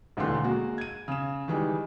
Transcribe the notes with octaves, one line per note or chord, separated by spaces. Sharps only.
E1 D#2 D3 E3 A3 C6
G#3 A#3 F#4
G#6 D#7
C#3 E7
D#3 E3 G3 G#3 D#4